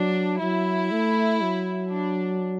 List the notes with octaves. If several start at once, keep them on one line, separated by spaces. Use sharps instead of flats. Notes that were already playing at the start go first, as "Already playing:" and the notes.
Already playing: F#3 D4
F#3 E4
A3
F#3
D4